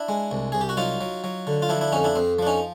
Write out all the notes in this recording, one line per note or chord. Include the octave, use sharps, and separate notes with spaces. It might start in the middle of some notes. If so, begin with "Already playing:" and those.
Already playing: D4 E4
G#3
C2
C2 G#4
G4
F#4
F#3 D#4 F4
F#3
F#3
D3
F4
F3 D4 E4
D4 E4
F2 C#4 D#4
D4 E4
F2 C4
F3 D4
C#4 D#4